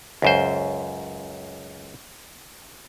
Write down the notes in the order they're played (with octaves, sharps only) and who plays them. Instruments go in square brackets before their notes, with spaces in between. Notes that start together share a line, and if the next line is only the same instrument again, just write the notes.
[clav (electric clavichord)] C#2 F#2 C5